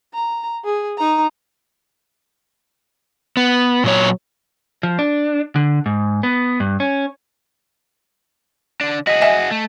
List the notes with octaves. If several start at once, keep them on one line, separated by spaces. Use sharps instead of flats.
A#5
G#4
D#4 A#5
B3
A#2 F#3 C#5
F3
D4
D3
G#2
B3
G2
C#4
D3 D4
F#4 G#4 D#5
D#5 E5 G#5
A3